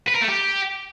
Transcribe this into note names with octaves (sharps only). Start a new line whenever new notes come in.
B4
A#4
A3
G4